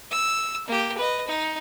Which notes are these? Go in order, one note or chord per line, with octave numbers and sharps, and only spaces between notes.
E6
A#3 G4
B4 D#5
D#4